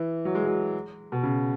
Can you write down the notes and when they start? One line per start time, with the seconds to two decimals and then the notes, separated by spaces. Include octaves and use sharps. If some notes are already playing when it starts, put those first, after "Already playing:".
Already playing: E3
0.25 F#3
0.35 G#3
0.45 F#3
1.12 B2
1.23 C#3